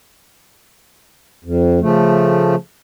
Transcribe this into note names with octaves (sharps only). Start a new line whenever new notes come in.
F2
C#3 F3 A3